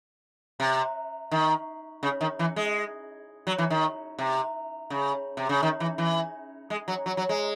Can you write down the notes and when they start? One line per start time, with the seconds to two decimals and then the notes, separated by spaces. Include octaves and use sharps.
0.60 C3
1.31 D#3
2.03 C#3
2.21 D#3
2.39 E3
2.56 G#3
3.47 F#3
3.58 E3
3.70 D#3
4.19 C3
4.90 C#3
5.37 C3
5.49 C#3
5.63 D#3
5.80 E3
5.98 E3
6.70 G#3
6.88 F#3
7.06 F#3
7.17 F#3
7.29 G#3